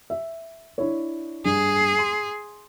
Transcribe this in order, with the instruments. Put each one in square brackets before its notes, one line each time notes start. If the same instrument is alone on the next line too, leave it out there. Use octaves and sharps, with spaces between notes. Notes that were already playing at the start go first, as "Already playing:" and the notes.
[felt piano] E5
D4 E4 C#5
[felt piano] G2 [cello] G#4
[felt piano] C6